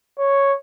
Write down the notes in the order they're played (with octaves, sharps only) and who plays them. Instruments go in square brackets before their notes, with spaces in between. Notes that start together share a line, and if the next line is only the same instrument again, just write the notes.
[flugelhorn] C#5